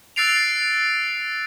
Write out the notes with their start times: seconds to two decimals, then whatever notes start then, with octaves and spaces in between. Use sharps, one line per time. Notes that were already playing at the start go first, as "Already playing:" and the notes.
0.16 E6 F#6 A6 C7 D7 F7